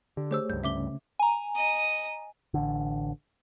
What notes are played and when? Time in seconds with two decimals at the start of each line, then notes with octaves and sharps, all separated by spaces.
0.17 D3 G4
0.31 A3 G4 G#4 C5 C#5 E6
0.50 C#2 G2 G6
0.64 C#3 A3 C#4 E5 D6 G7
1.19 G#5 A#5
1.56 D#5 D#6
2.54 A1 D3